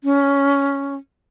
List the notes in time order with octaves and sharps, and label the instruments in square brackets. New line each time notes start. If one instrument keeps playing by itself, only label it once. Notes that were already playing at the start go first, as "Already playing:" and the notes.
[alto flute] C#4